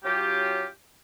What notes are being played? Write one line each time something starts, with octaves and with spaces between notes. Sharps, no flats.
F#3 C#4 F4 G4